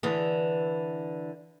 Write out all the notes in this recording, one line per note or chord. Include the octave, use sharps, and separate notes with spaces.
D3 E3 G#4